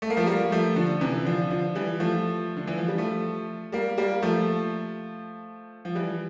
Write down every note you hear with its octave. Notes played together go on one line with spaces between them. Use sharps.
A3
A#3
F3 A3
G3 A#3
F3 A3
D3 F3
C3 E3
D3 F3
D3 F3
E3 G3
F3 A3
D3
E3
F3
G3
F3 A3
G3 A#3
G3 A#3
F3 A3
F3
E3 G3